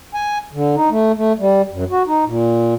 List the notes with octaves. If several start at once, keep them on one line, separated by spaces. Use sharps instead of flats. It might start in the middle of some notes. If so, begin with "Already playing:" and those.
G#5
D3
D#4
A3
A3
G3
F#2
F#4
D#4
A#2